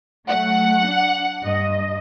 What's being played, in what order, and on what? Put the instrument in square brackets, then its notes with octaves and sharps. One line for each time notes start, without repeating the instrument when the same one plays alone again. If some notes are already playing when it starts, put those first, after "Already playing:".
[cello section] F#3 A3 [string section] F#5
[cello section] D4
G2 D#5